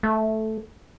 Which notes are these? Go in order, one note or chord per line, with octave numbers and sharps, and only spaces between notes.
A3